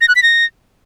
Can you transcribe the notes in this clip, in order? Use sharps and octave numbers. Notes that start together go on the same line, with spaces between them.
A#6
F#6
B6
A#6